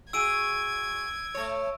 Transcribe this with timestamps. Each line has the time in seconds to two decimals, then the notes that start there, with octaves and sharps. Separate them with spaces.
0.13 F#4 G#4 E6 G#6 D7 D#7
1.34 A3 C#5